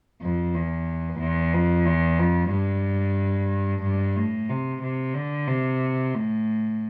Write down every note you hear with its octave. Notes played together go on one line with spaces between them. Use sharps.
F2
E2
E2
F2
E2
F2
G2
G2
A2
C3
C3
D3
C3
A2